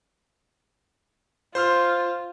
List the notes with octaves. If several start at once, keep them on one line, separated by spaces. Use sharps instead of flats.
F4 C5 C6 F6